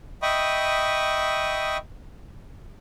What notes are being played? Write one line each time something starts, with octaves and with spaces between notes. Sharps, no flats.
D#5 E5 G5 B5 C#6 D#6